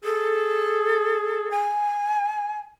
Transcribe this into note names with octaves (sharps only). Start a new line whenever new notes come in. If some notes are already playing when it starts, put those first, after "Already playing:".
G#4 A4
G#5